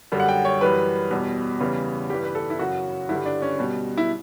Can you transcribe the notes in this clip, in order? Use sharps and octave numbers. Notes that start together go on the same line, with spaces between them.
F#2 D3 G3
F#5
G5
C#5
F#2 E3 G3 B4
E2 B2 G3
E2 C#3 E3 G3
G2 E3 G3 G4
B4
A4
E4
F#2 C#3 F#3 F#4
G2 D3 G3 E4
D4
C#4
B2 G3
E4